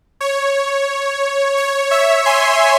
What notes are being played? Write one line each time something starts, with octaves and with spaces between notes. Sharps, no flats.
C#5
C#5
C#5 E5
G#5 C6